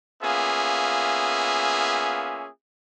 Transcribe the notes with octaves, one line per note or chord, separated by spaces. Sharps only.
A#3 B3 C#4 F4 G#4 E5